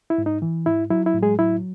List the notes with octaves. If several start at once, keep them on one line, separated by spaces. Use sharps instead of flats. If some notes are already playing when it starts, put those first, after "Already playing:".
E4
G#2
D#4
E3
G#2 E4
F#3 E4
E4
A2
G#3 G#4
F#3 E4